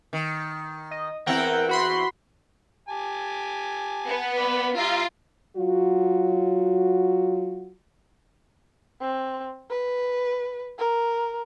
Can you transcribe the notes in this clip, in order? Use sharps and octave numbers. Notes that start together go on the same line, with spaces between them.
D#3
D#5
E2 C4 E4 A#4 F#5 G5
F#4 B5 C6
G4 G#5 A5
B3
B4 D5 B5
G3 F4 E5 A#5
F#3 F4 F#4
C4
B4
A#4